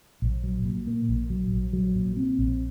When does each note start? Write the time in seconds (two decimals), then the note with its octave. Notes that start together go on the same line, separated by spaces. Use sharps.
0.22 A#1
0.44 F#3
0.65 A#2
0.87 A#3
1.09 A#1
1.30 F#3
1.51 A#1
1.73 F#3
1.95 A#2
2.17 C4
2.38 A#1